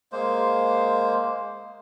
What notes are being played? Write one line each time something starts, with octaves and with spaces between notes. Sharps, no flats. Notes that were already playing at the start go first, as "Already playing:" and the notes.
G#3 A#3 C5